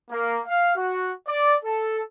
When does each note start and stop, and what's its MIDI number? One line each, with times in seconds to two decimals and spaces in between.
0.10 0.39 58
0.46 0.73 77
0.76 1.11 66
1.27 1.54 74
1.63 2.01 69